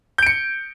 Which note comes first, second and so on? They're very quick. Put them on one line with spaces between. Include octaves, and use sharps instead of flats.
G6 D7 C#7